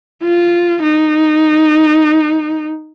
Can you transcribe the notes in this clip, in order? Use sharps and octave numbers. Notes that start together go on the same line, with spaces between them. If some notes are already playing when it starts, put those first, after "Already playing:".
F4
D#4